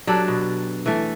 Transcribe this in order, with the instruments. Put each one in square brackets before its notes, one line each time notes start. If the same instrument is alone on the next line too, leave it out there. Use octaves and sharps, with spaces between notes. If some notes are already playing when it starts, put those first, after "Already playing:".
[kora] F#3 D4 G4 A4
B2
E3 A3